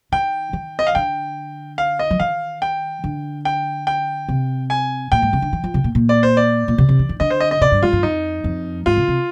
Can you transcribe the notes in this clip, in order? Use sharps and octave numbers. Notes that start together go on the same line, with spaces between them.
D#3 G5
D#3
D#5
F5
D3 G5
F5
D#5
F3
D#3 F5
G5
D3
G5
G5
C3
G#5
A#2 G5
G#2
C3
D3
D#3
F3
C3
A#2
A#2
D5
C5
D5
A#2
C3
C3
D#3
D#3
D3 D#5
C5
D#5
D#5
C3 D5
G2
G#2 F4
G2
F2 D#4
F2
G#2 F4
C3
C3